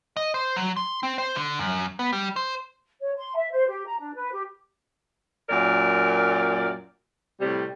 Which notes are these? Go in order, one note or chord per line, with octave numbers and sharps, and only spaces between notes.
D#5
C5
F#3
C6
C4
C5
D3
F#2
B3
G3
C5
C#5
C6
E5
C5
G4
A#5
D4
B4
G4
F#2 A#2 A#4 D5
A2 C3 G3